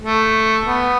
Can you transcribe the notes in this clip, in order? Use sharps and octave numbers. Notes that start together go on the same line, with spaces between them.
A3
B3